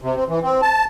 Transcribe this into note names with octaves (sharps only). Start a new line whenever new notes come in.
C3
C4
E3
C4
A5